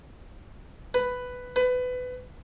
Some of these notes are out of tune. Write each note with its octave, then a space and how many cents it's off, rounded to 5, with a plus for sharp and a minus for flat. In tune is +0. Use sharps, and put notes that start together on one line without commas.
B4 +10
B4 +25